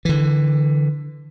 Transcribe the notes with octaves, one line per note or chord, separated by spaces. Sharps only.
D3 E3